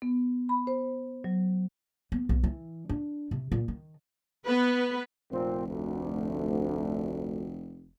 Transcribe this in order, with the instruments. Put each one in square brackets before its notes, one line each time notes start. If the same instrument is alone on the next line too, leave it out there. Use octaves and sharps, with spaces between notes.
[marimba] B3
B5
C5
F#3
[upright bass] B3
B1
E3
D4
C3
A#2
D#3
[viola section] B3 B4
[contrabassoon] F1 [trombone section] A#2 C4
[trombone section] D2